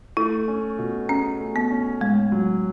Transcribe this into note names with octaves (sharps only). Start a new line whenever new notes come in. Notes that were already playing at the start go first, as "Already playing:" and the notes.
A3 E4
C#4
B2
C#4 G#4
A3
B3
C#4
A2 G#3
F#3